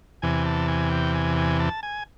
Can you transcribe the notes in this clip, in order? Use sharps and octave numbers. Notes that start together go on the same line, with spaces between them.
E2 C3 E3 G#5
A5
G#5
G5
G#5
G#5
A5
G#5